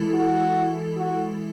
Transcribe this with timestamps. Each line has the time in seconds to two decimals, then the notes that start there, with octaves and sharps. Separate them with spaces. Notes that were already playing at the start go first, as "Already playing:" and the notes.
Already playing: E3 G#3 E4 A4
0.14 F#4
0.97 F#4